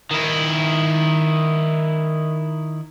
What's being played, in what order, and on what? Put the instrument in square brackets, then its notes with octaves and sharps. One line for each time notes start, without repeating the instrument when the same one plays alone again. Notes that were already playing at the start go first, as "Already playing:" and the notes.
[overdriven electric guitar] D#3 E4